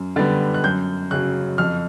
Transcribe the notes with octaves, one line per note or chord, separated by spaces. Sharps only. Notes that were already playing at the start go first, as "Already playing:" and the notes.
Already playing: F#2
D3 G3 B3 A6
F#6
F#2 G6
C#3 F#3 F#6
F2 F6